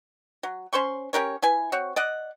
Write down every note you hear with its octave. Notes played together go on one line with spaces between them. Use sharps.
F#3
C#4 C5 C6 C#6
C#4 G4 A#4 C#5
E4 B4 G#5
C4 F#4 C#5
D5 D#5 F#5